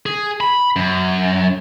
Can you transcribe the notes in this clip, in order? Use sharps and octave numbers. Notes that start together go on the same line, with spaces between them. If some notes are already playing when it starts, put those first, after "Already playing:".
G#4
B5
F#2